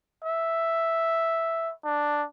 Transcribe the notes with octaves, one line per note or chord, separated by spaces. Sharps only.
E5
D4